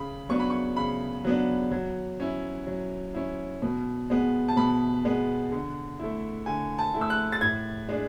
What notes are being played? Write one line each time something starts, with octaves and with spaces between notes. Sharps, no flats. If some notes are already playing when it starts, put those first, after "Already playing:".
Already playing: C#3 B5
F#3 B3 D4 C#6
B5
C#6
C#3 B5
F#3 B3 D4
F#3
C#4 E4
F#3
C#4 E4
B2
G#3 B3
A5
B2 B5
G#3 B3
D3
A3 E4
D3 G#5
A5
A3 E4
E6
F#6
A6
A2 G#6
G#3 D4